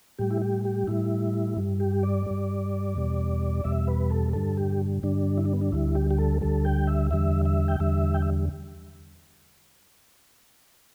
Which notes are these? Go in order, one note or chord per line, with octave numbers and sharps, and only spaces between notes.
A2 G3 G4
E4
G4
G4
A2 G3 E4
G2 G3
G4
D5
G2 G3
E2 B2 G3
E2 B2 G3 E5
B4
A4
G2 D3 G3 A4
G4
G2 D3 G3 D4
E4
D4
B3
D4
D2 D3 G3 E4
G4
G4
A4
D2 D3 G3 A4
G5
E5
E2 D3 G3 E5
E5
G5
E2 D3 G3 E5
G5
E5